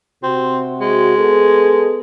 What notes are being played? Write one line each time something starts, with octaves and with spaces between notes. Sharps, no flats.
C3 C4 F#4
G#3
B3 G#4 A4